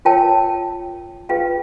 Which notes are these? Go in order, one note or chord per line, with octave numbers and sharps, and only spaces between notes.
F4 A#4 C#5 G5 A5
F4 G#4 B4 F5 G5